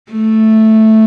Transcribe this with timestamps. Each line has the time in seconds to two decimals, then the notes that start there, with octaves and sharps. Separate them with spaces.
0.12 A3